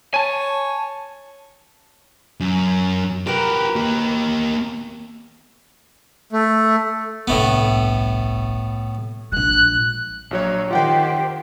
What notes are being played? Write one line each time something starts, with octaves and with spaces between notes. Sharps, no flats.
C#5 G#5 A5
F#2
F#4 G4 A#4 B4
A#3 G4
A3
G1 C2 A2 A3 B3
A#1 G#3 F#6
A#1 F#3 C#5
D#3 F4 G4 C5 F#5 G5